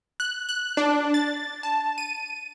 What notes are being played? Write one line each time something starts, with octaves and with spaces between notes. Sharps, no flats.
F#6
F#6
D4
A6
A5
D#7